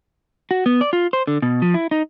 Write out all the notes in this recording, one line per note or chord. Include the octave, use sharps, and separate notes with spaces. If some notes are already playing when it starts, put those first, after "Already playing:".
F#4
B3
D5
F4
C5
D3
B2
F3
E4
D#4